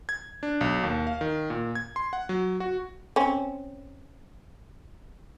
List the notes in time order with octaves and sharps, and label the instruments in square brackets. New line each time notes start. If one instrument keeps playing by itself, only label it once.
[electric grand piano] G#6
D4
B1
D#2
F5
D#3
A#2
G#6
C6
F#5
F#3
F#4
[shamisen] C4 C#4